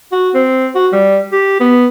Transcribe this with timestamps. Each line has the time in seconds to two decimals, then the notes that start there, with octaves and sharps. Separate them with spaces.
0.12 F#4
0.34 C4
0.75 F#4
0.92 G3
1.32 G4
1.60 B3